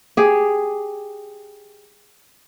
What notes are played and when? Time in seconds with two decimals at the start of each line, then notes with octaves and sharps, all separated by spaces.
0.17 G4 G#4